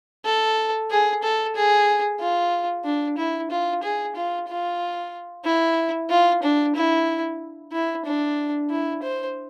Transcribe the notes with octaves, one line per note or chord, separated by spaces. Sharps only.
A4
G#4
A4
G#4
F4
D4
E4
F4
G#4
F4
F4
E4
F4
D4
E4
E4
D4
E4
C5